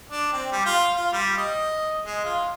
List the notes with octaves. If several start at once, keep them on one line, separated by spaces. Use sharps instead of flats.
D4
C4
G3
F4
F4
G3
D#5
G#3
F4